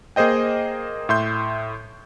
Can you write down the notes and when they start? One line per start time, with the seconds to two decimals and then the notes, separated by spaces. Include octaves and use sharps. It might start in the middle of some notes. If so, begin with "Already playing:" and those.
0.16 A#3 G#4 C5 D#5 G5
1.09 A2 E5 C6 G6